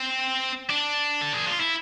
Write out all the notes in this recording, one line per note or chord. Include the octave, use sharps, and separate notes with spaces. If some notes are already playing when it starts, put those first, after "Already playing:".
Already playing: C4
D4
A4
G#4
F4
E4